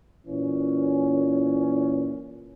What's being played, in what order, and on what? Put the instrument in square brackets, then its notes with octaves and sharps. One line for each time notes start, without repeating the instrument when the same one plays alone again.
[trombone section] A#2 E3 C#4